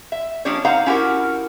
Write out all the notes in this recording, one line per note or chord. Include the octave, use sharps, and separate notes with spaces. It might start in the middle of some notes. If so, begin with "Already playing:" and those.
E5
F3 A#3 C#4 D4 G4 C#5
D#4 C5 F5 F#5 A#5
C#4 E4 F#4 G4 A#4